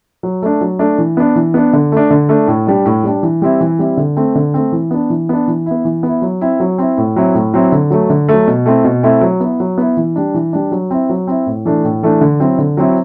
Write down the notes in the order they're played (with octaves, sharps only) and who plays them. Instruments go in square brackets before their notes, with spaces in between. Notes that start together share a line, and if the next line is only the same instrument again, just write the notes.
[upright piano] F#3
A3 D4
F#3
A3 D4
E3
B3 D4
E3
B3 D4
D3
A3 D4
D3
A3 D4
A2
G3 D4
A2
G3 D4
E3
G3 C4 E4
E3
G3 C4 E4
D3
A3 C4
D3
A3 C4
E3
B3 D4
E3
B3 D4
E3
B3 E4
E3
B3
E4
F#3
C4 E4
F#3
C4 E4
A2
F#3 C4 E4
A2
F#3 C4 E4
D3
F#3 A3
D3
F#3 A3
B2
A3 C4 E4
B2
A3 C4 E4
F#3
B3 E4
F#3
B3 E4
E3
G3 D4
E3
G3 D4
F#3
C4 E4
F#3
C4 E4
A2
E3 A3 D4
A2
E3 A3 D4
D3
F#3 C4 E4
D3
F#3 C4 E4